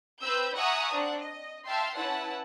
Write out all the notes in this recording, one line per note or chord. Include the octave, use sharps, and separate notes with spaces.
C4 B4 B5 E6 G6
E5 F#5 G#5 A#5 C#6 D#6
C4 D4 F#5
D#5
E5 F5 G5 A5 C6
C#4 E4 B4 F#5 A5